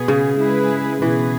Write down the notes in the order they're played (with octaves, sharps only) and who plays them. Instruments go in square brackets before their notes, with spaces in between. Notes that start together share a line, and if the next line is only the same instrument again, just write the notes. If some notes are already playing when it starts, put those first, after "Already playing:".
Already playing: [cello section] B2 B3 G#4
[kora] C#3
[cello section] G#3 E4 G#4 B4
[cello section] B2 B3 G#4 B4 [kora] E3